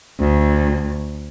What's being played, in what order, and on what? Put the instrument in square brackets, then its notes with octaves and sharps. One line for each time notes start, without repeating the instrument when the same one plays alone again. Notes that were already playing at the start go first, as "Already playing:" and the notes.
[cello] D2